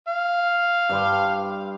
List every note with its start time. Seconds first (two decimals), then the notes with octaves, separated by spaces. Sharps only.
0.08 F5
0.89 G2 G3 C6